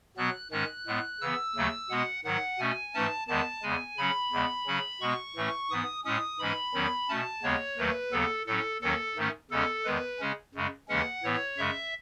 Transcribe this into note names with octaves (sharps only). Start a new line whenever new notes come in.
B2 F#3 B3 F#6
G#2 D#3 G#3 C#4 F#6
A2 G#3 B3
C#3 E3 B3 E6
D#2 C#3 F#3 A3
B2 G#3 B3 F#5
G#2 D#3 F#3 F#5
B2 A3 C#4 G#5
G#2 E3 A3 C#4 A5
E2 D#3 G#3 B3 A5
E2 C#3 G#3 G#5
C#3 F#3 C#4 B5
E2 C#3 G#3 B3
C#3 F#3 C#4
B2 G#3 B3 C#6
A2 E3 A3 C#4
G#2 E3 B3 D#6
A2 G#3 C#4 D#6
G#2 E3 G#3 C#4 B5
E2 D#3 F#3 C#4
B2 A3 C#4 A5
D#2 C#3 G#3 B3 C#5
D#2 D#3 F#3 A3 B4
D#2 C#3 F#3 B3 A4
A2 F#3 C#4 A4
D#2 D#3 F#3 C#4 A4
G#2 D#3 A3 C#4
E2 C#3 G#3 C#4 A4
E2 D#3 G#3 B4
C#3 G#3 C#4
F#2 C#3 G#3
D#2 C#3 E3 G#3 C#4 F#5
A2 E3 B3 C#5
F#2 C#3 G#3 E5